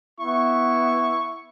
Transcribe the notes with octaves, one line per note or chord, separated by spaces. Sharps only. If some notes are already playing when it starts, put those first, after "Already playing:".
B3 E4 C#6